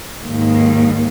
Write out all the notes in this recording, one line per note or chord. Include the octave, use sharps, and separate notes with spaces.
D#2 G#2